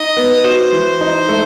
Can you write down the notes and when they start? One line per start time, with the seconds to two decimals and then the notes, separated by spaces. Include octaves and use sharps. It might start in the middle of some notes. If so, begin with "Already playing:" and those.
Already playing: D#4 D#5
0.17 B3
0.44 F#4 C5
0.72 E3
1.01 D#4
1.28 A3